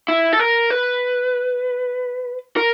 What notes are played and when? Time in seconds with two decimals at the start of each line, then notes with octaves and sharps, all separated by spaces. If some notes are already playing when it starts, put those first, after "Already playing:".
0.08 E4
0.33 A4
0.39 A#4
0.70 B4
2.57 A#4